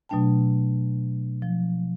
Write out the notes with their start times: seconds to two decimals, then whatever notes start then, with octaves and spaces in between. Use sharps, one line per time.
0.09 B2 F#3 A3 D4 G5 A5
1.42 F3